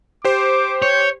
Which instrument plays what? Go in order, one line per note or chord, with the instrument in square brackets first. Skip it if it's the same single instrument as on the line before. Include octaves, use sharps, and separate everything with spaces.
[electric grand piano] G4 C5 [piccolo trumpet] D6
[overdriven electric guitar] C#5 [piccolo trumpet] G6